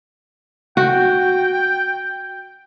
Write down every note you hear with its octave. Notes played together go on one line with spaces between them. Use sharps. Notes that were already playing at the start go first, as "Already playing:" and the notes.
F#4 G5